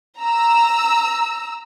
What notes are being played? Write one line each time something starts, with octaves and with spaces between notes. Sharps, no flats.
A#5 E6